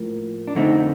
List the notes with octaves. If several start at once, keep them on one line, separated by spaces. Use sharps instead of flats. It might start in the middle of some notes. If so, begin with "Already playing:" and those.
Already playing: A2 F3 A#3
D4
F2 D3 A3 C4 D#4